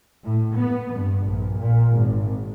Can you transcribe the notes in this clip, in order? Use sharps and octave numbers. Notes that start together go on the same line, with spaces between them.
A2
B3
G2
A#1
A#2
G#1